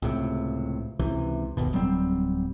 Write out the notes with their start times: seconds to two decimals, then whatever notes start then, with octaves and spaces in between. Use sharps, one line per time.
0.02 C#2 A2 C3
0.99 C#2 C3 E3
1.57 G1 D#2 B2
1.73 D1 F#3 G3 C4